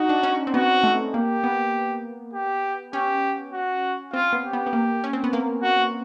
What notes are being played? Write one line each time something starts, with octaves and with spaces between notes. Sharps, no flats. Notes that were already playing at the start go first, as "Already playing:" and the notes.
Already playing: D#4 F#4
D4
C#4
C4
B3 F#4
A3
A#3 G4
B3
G4
C#4 G4
F#4
C4 F4
B3
G4
B3
B3
A#3
C#4
C4
B3
A#3
F#4